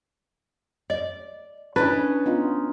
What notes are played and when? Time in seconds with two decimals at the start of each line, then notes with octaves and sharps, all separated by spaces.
0.90 D5 D#5
1.76 C#4 D4 E4 B4 D#5
2.26 B3 D#4 F4